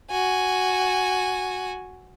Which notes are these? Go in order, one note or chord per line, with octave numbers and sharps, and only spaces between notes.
F#4 G#5